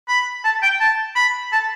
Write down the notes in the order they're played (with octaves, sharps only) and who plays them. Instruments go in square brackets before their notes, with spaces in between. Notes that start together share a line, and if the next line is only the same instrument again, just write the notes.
[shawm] B5
A5
G5
A5
B5
A5